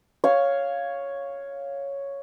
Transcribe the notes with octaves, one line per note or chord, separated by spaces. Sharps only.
C#5 F5